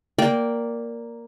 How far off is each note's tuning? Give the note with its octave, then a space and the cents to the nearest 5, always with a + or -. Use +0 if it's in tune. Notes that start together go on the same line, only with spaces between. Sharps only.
A#3 +0 D5 -10 G5 +0